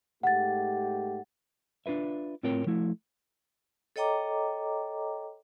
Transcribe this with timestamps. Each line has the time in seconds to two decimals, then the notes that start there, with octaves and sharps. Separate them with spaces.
0.23 G#2 A3 G4 F#5 A6
1.86 D4 F4 B4 E5
2.43 A2 C4 F4 A#4 C#5 G5
2.67 F3 A3 E4
3.96 A4 C#5 D#5 G5 A#5 D6